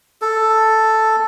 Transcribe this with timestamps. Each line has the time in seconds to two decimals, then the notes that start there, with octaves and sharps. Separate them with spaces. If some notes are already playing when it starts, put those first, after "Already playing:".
0.22 A4